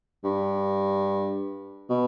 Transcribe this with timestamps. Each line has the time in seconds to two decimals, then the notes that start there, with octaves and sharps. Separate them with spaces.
0.24 G2
1.89 B2